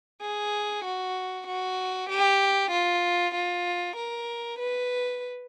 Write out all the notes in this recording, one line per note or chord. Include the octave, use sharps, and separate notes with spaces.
G#4
F#4
F#4
G4
F4
F4
A#4
B4